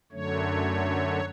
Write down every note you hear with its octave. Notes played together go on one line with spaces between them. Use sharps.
F#2 D3 F#3 A3 C#5